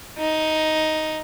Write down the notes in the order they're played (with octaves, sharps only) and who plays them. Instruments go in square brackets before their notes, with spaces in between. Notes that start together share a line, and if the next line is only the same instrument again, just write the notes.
[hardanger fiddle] D#4